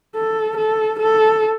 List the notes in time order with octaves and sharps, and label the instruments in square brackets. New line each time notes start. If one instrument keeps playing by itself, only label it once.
[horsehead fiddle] A4
A4
A4